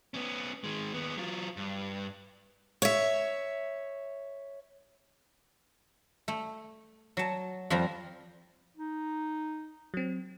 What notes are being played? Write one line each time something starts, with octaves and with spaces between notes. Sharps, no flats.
B3 C#4
D#3 G#3
D#2 B3
F#3 F4
G2
C#5 E5
A3
F#3 A5
F2 F3 G3 A#5
D#4
F#3 C4